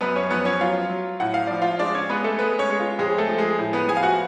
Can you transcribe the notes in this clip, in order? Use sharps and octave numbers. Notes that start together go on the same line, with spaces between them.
F#2 B3 B4
C#4 C#5
F3 B3 B4
C#4 C#5
F#3 F4 F5
F#3
A2 F#5
F5
F3 D5
F4 F5
G#3 D4 D5
C#4 C#5
G#3 B3 B4
A3 A4
G#3 B3 B4
C#4 C#5
G#3
F4
F2 G#3 G#4
A3 A4
F3
G#3 G#4
A2
B3 B4
F3 G#4 G#5
F5
F#4 F#5